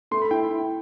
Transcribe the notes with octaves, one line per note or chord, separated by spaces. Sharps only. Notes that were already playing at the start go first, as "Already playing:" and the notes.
A3 C6
B5
E4 G5